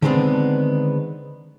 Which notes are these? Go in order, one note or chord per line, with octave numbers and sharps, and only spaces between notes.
D3 D#3 G#3 B3 C4 D4